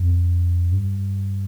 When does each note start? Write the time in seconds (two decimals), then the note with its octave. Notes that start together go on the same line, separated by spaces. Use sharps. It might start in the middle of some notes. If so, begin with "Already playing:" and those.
Already playing: F2
0.72 G2